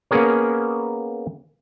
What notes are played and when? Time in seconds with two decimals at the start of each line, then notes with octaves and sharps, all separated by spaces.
0.11 A#3 B3 C#4 G#4 A#4 C#5